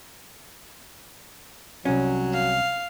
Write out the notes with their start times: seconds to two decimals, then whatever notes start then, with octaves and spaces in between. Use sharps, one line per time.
1.85 C2 F#3 C#4
2.33 F5